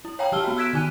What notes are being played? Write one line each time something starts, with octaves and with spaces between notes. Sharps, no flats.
E4
C#5 F5 G5 G#5 A#5
E3 G4 A5 E6 F6 G7
B3 F#4
E6 F#6 G#6 B6 D7 E7
D#3 D#4 G#5 F#6 D#7